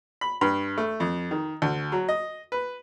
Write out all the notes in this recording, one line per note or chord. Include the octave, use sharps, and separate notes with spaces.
B5
G2
A3
F2
D#3
D2
F#3
D#5
B4